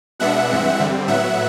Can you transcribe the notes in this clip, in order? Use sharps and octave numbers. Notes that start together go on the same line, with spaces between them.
B2 G#3 B3 D4 E5 F#5
G2 E3 G#3 C4
G2 D3 G3 C4
A2 F#3 B3 E5 F#5